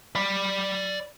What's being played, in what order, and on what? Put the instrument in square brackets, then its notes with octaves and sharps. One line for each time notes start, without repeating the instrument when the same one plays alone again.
[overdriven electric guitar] D5 B5